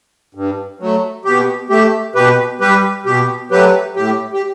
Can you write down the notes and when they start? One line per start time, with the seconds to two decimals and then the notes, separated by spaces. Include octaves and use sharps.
0.35 G2
0.80 F#3 A3
1.25 B2 G4
1.70 A3 G4
2.15 B2 G4 B4
2.61 G3 G4 B4
3.06 B2 G4
3.51 F#3 A3 G4 B4
3.96 A2 G4
4.33 G4